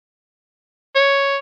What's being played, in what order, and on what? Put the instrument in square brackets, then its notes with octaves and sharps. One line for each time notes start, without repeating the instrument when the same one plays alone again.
[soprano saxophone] C#5